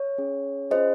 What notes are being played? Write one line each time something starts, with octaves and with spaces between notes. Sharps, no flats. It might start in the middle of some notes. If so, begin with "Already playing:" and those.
Already playing: C#5
C#4 G#4
C#4 F4 G#4 C5 D#5